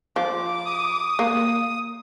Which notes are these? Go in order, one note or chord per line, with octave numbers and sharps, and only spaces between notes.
F3 D6
D#6
A#3